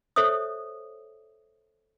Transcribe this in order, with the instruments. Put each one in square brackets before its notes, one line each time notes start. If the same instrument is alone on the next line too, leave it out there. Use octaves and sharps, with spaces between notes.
[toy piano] A4 C5 C#5 E5 D#6